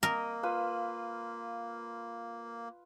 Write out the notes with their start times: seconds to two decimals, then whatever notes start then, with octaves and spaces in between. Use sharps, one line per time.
0.03 A#3 A#4 D#5
0.43 F4 B4 E6